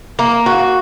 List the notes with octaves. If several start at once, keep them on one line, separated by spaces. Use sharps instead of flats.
A#3
F#4